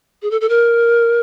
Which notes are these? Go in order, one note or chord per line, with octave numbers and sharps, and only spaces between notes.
G#4
A4
A4
A#4